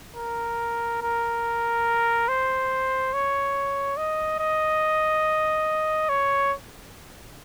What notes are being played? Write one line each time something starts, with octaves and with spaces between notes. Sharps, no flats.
A#4
A#4
C5
C#5
D#5
D#5
C#5